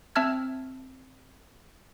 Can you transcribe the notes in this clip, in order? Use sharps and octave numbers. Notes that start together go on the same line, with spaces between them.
C4 E5 A5 E6 F6 G#6